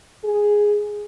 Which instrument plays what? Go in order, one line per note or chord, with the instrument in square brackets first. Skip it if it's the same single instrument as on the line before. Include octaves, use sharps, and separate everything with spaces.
[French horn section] G#4